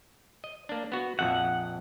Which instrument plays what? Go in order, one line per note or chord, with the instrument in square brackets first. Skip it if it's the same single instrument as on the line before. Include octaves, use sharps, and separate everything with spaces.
[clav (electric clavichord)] D#5
A#3 D4
B3 F#4
[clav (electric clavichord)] A#1 F2 E5 [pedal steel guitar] F#5